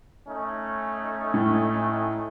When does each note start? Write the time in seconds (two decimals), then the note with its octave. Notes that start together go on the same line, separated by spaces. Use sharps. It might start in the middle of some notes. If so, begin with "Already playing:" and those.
0.26 A3 C#4 D#4
1.34 A2